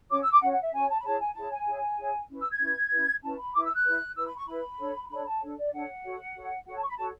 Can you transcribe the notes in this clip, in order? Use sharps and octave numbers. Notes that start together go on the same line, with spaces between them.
C#4 F#4 C#5 D6
E6
D6
C#4 F#4 C#5 F#5
F#5
E5
C#4 F#4 C#5 G#5
A5
B5
E4 G#4 C#5 A5
G#5
E4 G#4 C#5 A5
G#5
E4 G#4 C#5
E4 G#4 C#5
C#4 E4 B4
E6
G#6
C#4 E4 B4
C#4 E4 B4
C#4 E4 B4 A5
B5
E4 B4 D6
E6
F#6
E4 B4
E4 B4 E6
B5
C#6
E4 B4 B5
D4 A4 C#5
D4 A4 C#5 B5
A5
D4 A4 C#5
D5
D4 A4 C#5 F#5
F#4 A4 C#5
F#4 A4 C#5
F#4 A4 C#5 F#5
A5
C#6
B5
F#4 A4 C#5 A5